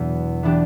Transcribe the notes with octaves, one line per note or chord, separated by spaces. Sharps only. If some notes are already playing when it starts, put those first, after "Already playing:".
Already playing: E2 B2 F#3 B3 D4
E3 B3 D4 G4